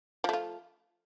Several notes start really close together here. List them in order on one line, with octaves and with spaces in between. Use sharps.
F3 A3 F4